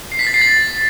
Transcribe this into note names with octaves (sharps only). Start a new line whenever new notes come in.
C7
B6
A6
C7
A6